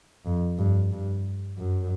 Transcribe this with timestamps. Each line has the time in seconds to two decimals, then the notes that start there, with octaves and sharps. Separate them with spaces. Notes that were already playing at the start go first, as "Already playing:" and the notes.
0.26 F2
0.58 G2
0.92 G2
1.58 F#2